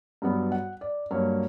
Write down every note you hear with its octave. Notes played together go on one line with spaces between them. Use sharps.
G2 F#3 B3
F#5
D5
G2 F#3 A#3 C#5